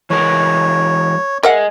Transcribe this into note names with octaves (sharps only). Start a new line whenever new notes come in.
E3 G#3 A#4 C#5
G#4 A#4 D#5 E5 F#5